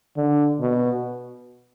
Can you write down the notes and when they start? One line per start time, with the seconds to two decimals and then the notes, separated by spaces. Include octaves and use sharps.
0.17 D3
0.60 B2